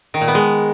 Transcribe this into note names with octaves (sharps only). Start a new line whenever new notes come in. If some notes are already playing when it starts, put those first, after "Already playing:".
D#3
A#2
B3
G#3